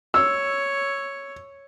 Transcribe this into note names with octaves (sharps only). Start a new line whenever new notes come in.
C#5 E6